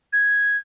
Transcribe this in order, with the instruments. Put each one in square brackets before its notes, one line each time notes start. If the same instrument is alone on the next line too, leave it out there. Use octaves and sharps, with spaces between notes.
[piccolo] G#6